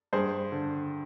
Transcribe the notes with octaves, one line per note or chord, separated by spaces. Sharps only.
G2 G#4 C5
D3